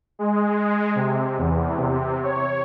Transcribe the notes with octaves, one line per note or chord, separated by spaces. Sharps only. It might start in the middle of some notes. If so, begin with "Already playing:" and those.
G#3
C3
E2
C3
C#5